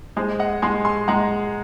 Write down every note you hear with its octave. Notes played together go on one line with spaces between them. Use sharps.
G#3 C5 D#5
D#5 F#5
G#3 G#5 C6
G#5 C6
G#3 F#5 A#5